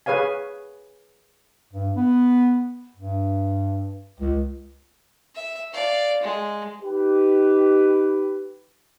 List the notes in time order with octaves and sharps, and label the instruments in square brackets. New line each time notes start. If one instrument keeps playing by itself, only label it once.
[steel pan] G#4 B4 C#5 F5 G#5
[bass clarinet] G2
B3
G2
C#2
[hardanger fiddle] E5
D5 F5
G#3
[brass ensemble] D#4 G4 B4